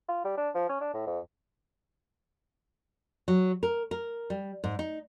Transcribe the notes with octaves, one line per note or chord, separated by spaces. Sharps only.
F4
G3
D4
F3
C#4
D4
A2
F2
F#3
A#4
A#4
G3
G#2
D#4